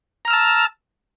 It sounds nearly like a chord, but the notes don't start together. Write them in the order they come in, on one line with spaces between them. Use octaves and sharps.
A#5 F6 E6 A5